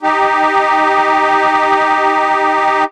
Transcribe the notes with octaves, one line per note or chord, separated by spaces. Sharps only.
D#4 G4